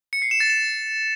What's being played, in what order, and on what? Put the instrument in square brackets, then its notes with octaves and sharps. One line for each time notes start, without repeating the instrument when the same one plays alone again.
[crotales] C#7
C7
E7
A6
E7